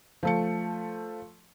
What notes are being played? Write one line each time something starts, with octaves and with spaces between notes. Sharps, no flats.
F3 A3 C#7